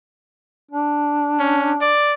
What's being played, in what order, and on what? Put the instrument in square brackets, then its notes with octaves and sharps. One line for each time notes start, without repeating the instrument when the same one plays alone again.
[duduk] D4
[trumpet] C#4
D5